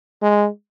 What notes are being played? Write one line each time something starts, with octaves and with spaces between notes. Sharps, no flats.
G#3